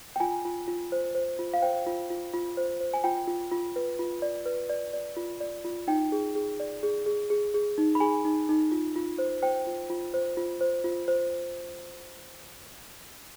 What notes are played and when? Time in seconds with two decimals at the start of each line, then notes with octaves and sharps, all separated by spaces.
0.16 G5
0.20 F4 G#5
0.45 F4
0.68 F4
0.92 C5
1.15 C5
1.39 F4
1.54 F5
1.62 C5 G5
1.86 F4
2.10 F4
2.33 F4
2.57 C5
2.80 C5
2.94 G#5
3.04 F4 G5
3.27 F4
3.52 F4
3.76 B4
3.99 F4
4.22 D5
4.46 B4
4.70 D5
4.93 D5
5.17 F4
5.40 D5
5.65 F4
5.87 D#4 G5
6.12 G#4
6.35 G#4
6.60 D5
6.83 G#4
7.06 G#4
7.30 G#4
7.54 G#4
7.78 D#4
7.95 B5
8.00 G#4 G#5
8.25 D#4
8.49 D#4
8.72 F4
8.96 F4
9.18 C5
9.42 C5 G5
9.67 F4
9.90 F4
10.14 C5
10.37 F4
10.61 C5
10.84 F4
11.08 C5